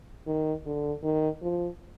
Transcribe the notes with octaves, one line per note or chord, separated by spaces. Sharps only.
D#3
D3
D#3
F3